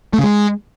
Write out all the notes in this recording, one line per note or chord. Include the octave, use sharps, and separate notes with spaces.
A3
C#3
G#3